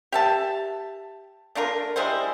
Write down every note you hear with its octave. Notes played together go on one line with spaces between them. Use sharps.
G4 E5 A5
A3 D4 F4 A#4
G3 G#3 E4 C5